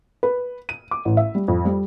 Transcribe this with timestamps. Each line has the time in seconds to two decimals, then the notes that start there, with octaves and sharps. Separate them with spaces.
0.23 B4
0.69 D#7
0.91 D6
1.05 A1
1.17 E5
1.35 G3
1.48 F2
1.65 G3